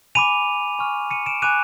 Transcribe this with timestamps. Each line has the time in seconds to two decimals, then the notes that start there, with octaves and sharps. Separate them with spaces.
0.15 G#5 B5 D6 D#7 F7
0.79 G#5 C#6 F6
1.11 C#7 D#7
1.26 D7 E7
1.42 G#5 B5 D6 F#6 D#7 F7